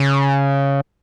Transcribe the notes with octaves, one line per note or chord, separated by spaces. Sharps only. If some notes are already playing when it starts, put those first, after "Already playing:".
Already playing: C#3